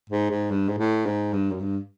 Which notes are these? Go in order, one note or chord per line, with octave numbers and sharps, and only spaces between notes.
G#2
G#2
G2
G#2
A2
G#2
G2
F#2
G2